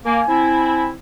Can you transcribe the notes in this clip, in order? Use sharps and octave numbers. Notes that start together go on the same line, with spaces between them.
A#3 G#5
C4 E4